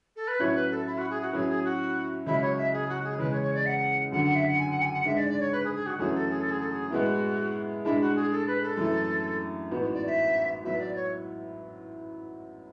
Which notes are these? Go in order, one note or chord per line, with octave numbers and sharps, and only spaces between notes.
A4
B4
A2 F#3 C#4 E4 C#5
B4
A4
E4
F#4
G#4
F#4
A2 F#3 C#4 E4 G#4
G#4
F#4
C#2 C#3 F#3 E4
C#5
E5
G#4
F#4
G#4
E2 C#3 G#3 C#4 B4
C#5
C#5
D5
F#5
F#2 D3 F#3 F#5
F#5
E5
F#5
G#5
F#5
G#5
F#5
G#2 G#3 D4 E5
D5
D5
C#5
B4
G#4
G#4
F#4
F#2 E3 A3 C#4 F#4 G#4
A4
G#4
A4
G#4
A4
G#4
A2 G#3 B3 E4 F#4
A2 G#3 D4 E4
F#4
G#4
A4
B4
A4
F#2 E3 A3 E4
A1 G#2 E3 B3 F#4
D5
E5
A2 F#3 B3 E4 E5
D5
C#5